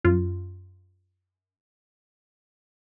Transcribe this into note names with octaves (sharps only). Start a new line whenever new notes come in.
F#2 F4